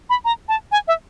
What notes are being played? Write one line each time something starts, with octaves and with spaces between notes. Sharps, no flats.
B5
A#5
A5
G#5
E5